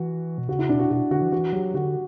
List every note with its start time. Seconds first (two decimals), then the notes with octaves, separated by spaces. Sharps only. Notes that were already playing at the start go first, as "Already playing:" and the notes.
Already playing: E3 F#4
0.38 B2
0.48 C#3 F#4
0.59 E4
0.69 B2 D4
0.79 F#4
0.90 B2 F#4
1.11 D3 F#4
1.21 E3
1.32 E3 F#4
1.53 F#3 G4
1.74 D3 F#4